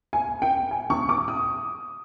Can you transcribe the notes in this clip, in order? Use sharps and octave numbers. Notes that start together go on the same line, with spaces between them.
G#5
G5
G#5
C#6
D6
D#6